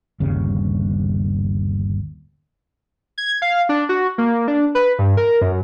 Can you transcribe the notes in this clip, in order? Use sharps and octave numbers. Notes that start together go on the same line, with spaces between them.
G1 D#2 C#3 G3
G#6
F5
D4
F#4
A#3
D4
B4
G2
A#4
F#2